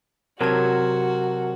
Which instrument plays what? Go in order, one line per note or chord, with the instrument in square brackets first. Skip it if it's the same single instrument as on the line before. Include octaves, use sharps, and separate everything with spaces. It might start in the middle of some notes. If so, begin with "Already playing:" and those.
[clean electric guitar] C3 F#3 [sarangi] F#4 [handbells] A#4 A5 G#6